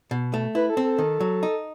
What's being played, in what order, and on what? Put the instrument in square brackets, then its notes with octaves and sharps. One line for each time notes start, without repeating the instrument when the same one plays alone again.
[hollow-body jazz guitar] B2
A3
[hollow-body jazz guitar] E4 [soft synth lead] B4
[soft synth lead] A4
[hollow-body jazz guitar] C4
[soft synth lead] A4
[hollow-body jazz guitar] D#3
F#3
D#4